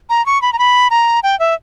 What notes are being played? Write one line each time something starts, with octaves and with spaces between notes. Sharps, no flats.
A#5
C#6
B5
A#5
B5
A#5
G5
E5